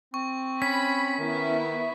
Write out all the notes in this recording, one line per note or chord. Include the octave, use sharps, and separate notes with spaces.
C4 C#6
C#4 B5 B6
D#3 B3 E4